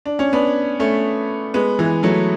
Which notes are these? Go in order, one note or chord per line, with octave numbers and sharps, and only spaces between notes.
D4
C#4
B3 D4
A3 C#4
G#3 B3
E3 G#3
F#3 A3